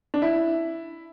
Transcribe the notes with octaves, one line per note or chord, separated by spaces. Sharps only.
D4
E4